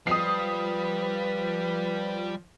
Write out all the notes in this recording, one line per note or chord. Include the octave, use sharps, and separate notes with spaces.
F3 G3 B4 D#6 C7